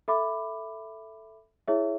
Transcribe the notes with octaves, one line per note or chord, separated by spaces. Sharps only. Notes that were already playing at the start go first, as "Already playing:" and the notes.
A4 E5 B5 D6
E4 G#4 C#5 E5